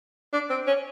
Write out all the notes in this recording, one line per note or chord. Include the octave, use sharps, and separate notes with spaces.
D4
C4
C#4